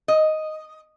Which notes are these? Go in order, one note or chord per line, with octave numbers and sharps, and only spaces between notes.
D#5